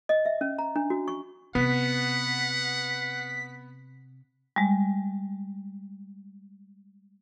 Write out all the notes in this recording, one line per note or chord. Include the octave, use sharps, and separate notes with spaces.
D#5
E5
C#4
A#5
D4
F#4
C#6
C3 B3 F#5 B6
G3 G#3